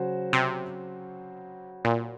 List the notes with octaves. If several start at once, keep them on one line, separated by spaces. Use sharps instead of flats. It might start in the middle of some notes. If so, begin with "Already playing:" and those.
Already playing: C#3 F#3 C#4 F#4 C5
C3
A#2